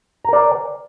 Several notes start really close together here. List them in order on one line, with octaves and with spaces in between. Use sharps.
A#5 A#4 D5